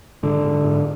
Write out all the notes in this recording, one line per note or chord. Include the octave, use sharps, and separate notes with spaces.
G#2 D3
G#2
G#2